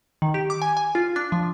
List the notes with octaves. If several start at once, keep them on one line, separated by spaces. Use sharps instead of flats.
D#3
G4
D6
G#5
G#5
F4
D4
F3